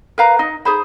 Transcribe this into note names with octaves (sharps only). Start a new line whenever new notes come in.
A#4 B4 F5 A#5
D#4 D#5
D#4 G#4 C5 B5